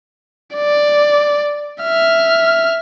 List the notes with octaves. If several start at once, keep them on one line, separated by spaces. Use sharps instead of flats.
D5
E5 F6